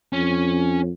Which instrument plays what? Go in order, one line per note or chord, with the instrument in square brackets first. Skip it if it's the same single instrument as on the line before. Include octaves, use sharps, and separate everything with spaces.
[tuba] F2 [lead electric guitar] C#4